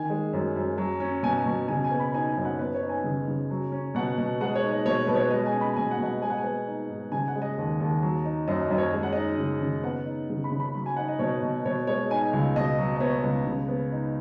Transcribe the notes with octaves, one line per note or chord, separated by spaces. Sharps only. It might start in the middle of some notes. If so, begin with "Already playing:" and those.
Already playing: D#3 G#5
G#3
F#2
F#2
F#3
C#4
B2 G#5
B2
C#3 G#5
G#5
B3
B5
D#4 G#5
G#5
F#2
F#5
B3 B4
C#5
D#4
G#5
C#3
C#3
F#3
C#4
B2 F#5
B2
G#3 F#5
C#5
D#4
D#5
B2 C#5
B2 B4
C#5
G#3 D#5
G#5
C#4
B5
B2 G#5
F#5
B2 D#5
F#5
G#3 G#5
F#5
G#5
B3
D#4
G#2
C#3 G#5
F#5
G#3
D#5
D#2
D#2
F#3
D#4
F#2 D#5
F#2 D#5
C#5
G#3 D#5
F#5
D#4 D#5
C#3
C#3
B3 F#5
D#4
C#3
B5
C#3
B5
F#3 B5
G#5
D#4 F#5
D#5
B2 C#5
B2
B2 C#5
G#3 C#5
D#4 G#5
C#2
B2 D#5
F#3
D#5
B3 C#5
C#2
C#3
B3
D#4